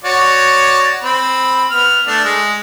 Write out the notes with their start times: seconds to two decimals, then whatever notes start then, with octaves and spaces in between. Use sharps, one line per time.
0.04 F#4 C#5 D5
1.03 C4 B5
1.71 B3 F6
2.07 A3 D4
2.24 G#3